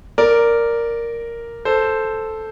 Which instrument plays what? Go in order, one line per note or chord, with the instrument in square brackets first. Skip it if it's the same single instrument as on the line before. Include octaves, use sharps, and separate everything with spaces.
[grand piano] A#4 D5
A4 C5